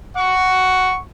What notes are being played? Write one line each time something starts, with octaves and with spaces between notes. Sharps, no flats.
F#5 C#6